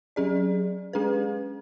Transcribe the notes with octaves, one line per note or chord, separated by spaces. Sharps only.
F#3 C#4 G#4 D5
G#3 C#4 G#4 B4